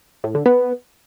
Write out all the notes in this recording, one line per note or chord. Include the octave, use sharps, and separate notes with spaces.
A2
D3
B3